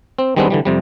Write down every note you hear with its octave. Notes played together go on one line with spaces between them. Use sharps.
C4
D#3 G3 G#3 B3 C4 D4
D3 E3 G3
F2 C3 G3